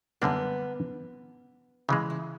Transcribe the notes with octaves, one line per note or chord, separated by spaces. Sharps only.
F#2 D3 G3 A#3 B3 D4
C#3 E3 G#3 D#4
E4